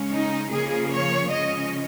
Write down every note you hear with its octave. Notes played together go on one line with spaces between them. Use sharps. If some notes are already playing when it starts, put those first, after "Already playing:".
Already playing: C#3 G#3 C#4
D#4
C#3 F3 A#3 C#4 G#4
C#5
C#3 F3 G#3 C#4 D#5